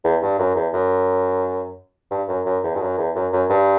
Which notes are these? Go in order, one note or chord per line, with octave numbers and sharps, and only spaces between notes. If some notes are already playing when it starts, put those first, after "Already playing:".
E2
G2
F#2
E2
F#2
G2
F#2
F#2
E2
G2
F#2
E2
F#2
F#2
G2